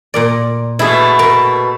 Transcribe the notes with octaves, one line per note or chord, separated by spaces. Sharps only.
A#2 A#4 D5
B2 A3 E4 G#4
A#4